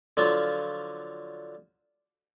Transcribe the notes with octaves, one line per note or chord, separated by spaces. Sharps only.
D3 F3 F#3 F4